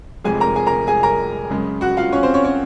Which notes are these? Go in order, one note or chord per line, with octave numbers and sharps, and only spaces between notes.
F1 F2 C3 F3 G#3 G#4 G#5
A#4 A#5
G#4 G#5
A#4 A#5
G#4 G#5
A#4 A#5
F#2 C#3 G#3
F#4 F#5
F4 F5
C#4 C#5
C4 C5
C#4 C#5
C#4 C#5